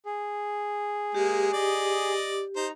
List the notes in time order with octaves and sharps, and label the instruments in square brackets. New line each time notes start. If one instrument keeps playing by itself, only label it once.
[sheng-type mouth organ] G#4
[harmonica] G#3 A#3 [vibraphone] G4
[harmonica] D5 D#5
[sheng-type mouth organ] D#4 A#5 [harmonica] C5